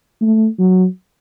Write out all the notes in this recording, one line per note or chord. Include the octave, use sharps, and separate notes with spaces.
A3
F#3